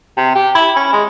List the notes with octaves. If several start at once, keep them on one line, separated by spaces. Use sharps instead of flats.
C3
G4
E4
C#4
G#3